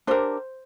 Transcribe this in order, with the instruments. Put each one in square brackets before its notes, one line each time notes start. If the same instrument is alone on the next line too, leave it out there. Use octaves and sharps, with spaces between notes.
[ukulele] D4 G4 A#4 C5